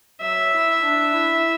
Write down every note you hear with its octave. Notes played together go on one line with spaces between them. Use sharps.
F#3 E5
E4
D4
E4